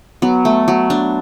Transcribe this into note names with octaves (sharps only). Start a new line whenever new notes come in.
F#3 B3
A3
F#3
D4